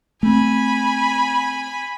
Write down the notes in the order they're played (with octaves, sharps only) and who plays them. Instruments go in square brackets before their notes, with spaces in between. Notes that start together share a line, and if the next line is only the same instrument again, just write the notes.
[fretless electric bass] A3 C4 [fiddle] G#5 B5